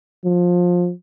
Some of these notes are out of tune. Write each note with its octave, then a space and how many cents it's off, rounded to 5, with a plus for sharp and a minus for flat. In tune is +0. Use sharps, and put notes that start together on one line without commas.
F3 +20